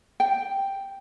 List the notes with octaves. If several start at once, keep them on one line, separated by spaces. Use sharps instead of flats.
G5